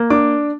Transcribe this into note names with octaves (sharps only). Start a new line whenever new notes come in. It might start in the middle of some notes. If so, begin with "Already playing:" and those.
Already playing: A#3
D4 D6